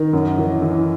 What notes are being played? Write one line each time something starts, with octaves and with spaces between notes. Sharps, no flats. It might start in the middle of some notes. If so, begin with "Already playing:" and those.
Already playing: D#3 D#4
F#2
E3
E3